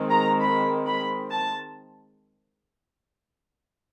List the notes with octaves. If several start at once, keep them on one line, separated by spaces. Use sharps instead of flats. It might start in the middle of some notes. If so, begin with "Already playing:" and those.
Already playing: D#3 G#3 C4
A#5
B5
B5
A5